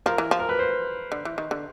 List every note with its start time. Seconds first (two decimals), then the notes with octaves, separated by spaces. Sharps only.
0.06 F3 A#4
0.18 E3
0.31 F3
0.39 A#4
0.49 B4
0.59 C5
1.12 D3
1.25 E3
1.38 D#3
1.51 D3